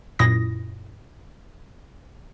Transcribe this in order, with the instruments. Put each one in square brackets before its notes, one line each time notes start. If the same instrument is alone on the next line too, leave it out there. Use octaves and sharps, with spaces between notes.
[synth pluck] F#2 A#2 E4 D#6 A#6